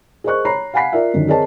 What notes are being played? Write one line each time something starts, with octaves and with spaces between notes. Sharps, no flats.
G#4 A#4 C5 D#5 C#6 F#6
C#5 A#5 B5 C7
F5 F#5 G#5 B5 B6 C7
F4 A#4 D5 E5
F#2 D3 D#3
C4 G#4 A#4 C#5 D#5 A5